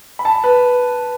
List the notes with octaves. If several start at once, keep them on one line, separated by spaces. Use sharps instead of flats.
B5
A5
B4